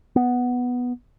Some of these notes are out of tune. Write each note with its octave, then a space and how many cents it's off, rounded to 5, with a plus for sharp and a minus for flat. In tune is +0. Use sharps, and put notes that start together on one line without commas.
B3 +0